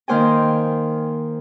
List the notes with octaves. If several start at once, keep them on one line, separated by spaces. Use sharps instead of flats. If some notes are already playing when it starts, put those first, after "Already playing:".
D#3 A#3 C5 G5 G#5